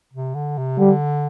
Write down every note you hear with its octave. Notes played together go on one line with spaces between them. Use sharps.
C3
D3
C3
D3 G3